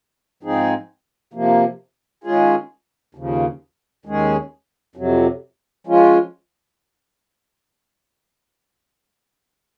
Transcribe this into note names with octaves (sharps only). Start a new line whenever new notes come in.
G#2 F3 C4 D#4 G#4
C3 F3 A#3
D#3 G#3 C#4 F4 G#4
D#2 C#3 F3
D#2 D#3 G#3 C#4 G#4
F2 C3 F#3
F3 G#3 C#4 F4